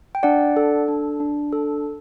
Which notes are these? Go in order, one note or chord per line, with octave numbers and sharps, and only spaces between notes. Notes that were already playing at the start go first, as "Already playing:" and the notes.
G5
D4 D5 F#5
A4
D4
D4
A4